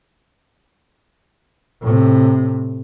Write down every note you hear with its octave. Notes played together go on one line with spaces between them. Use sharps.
A2 C3